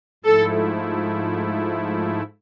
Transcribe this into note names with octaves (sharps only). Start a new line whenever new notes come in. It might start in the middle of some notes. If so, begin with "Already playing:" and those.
G#2 F3 A3 E4 A4